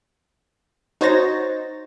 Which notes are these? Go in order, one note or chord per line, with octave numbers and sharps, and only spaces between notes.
D#4 F#4 C5 C#5 A6 A#6